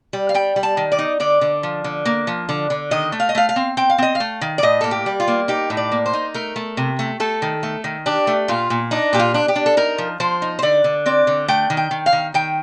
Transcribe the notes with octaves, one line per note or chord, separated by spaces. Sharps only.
G3
F5
G3 G5
G3
A5
D#3
D5
D#4
D3 D5
D3
F3
D3
A#3
F3
D3
D3
D#3 D#5
A3
F5
D#5
A3 F5
F5
C4
C4 G5
F5
C4 D#5
F5
A3
D#3
D5
A2 D#5
A#3 A4
G4
G3
F4
A#3
D#4 G4
A2
D5
A#3
C5
D#4
A3 A#4
A3
C3
A3
A3 A4
D#3
A3
D#3
D4 G4
A3
A#2 F4
A#2
D4 D#4
A#2 G4
F4
D4
G4
D4
A4
D#4 A#4
F3
F3 C5
D#4
C5
D3 D5
D3
C4 D5
D3
A3 G5
D#3
G5
D#3
F5
D#3
D#3 G5